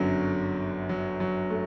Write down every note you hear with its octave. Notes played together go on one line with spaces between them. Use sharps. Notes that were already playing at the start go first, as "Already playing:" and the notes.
Already playing: G1 F#2 D3 F#3
F#3
F#3
A3